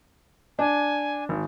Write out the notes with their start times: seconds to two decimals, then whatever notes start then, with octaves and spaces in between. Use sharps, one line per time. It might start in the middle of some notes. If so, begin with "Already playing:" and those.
0.59 D4 G#5
1.29 G#1